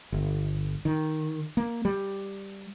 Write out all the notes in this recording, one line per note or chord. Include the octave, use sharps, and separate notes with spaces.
G1
D#3
A#3
G3